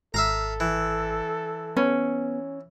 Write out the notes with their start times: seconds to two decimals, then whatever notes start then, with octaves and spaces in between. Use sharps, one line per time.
0.14 G#1 A4 E5 F5 A#5
0.60 E3
1.77 B3 C#4